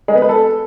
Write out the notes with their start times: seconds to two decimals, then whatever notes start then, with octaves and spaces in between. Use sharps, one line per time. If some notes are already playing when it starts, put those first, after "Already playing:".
0.08 G#3
0.15 B3
0.22 B4
0.29 A4